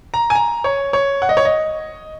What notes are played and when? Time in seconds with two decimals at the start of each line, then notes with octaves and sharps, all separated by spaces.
0.14 A#5
0.30 G#5
0.35 A#5
0.64 C#5
0.93 C#5
1.22 F#5
1.29 D#5
1.37 C#5
1.45 D#5